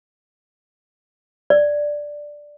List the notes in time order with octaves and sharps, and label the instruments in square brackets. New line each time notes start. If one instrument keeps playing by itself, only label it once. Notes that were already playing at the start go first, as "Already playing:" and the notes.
[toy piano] D5